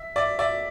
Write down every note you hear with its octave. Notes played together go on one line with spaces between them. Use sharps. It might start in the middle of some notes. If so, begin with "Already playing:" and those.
Already playing: E5
D5 E5
D5 E5